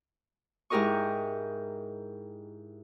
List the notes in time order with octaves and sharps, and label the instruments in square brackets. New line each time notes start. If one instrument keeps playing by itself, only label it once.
[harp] G#2 E4 G4 A#4 D#5 C#6